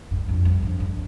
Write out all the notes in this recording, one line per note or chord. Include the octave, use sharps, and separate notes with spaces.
G2
F2
G2
F2
G2